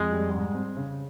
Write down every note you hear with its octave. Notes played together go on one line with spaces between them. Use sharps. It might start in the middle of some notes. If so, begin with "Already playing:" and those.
Already playing: F2 G#3
G3
G#2
C4
C#3